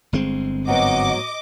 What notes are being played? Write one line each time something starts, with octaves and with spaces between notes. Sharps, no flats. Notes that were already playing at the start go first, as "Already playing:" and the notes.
G1 G#3 C4
G#2 F#3 B3 D#5 F#5 D6